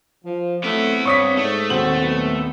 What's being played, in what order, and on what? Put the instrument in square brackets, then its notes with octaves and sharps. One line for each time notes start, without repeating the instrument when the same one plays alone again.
[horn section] F3
[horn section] F#3 A3 [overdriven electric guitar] B3 E4 [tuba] C4
[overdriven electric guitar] G2 [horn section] B3 C#5 [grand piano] C#6 D#6 B6
[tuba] G#2 [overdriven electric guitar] A3
[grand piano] D#1 C4 F#7 [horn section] F#4
[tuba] B1 [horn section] B3